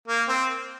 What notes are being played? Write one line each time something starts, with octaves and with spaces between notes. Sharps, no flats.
A#3
C4